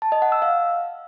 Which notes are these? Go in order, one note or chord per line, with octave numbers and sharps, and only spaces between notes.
A5
D#5
F#5
E6
F5